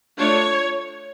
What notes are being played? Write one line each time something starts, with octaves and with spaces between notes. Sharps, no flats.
A3 D4 F4 C#5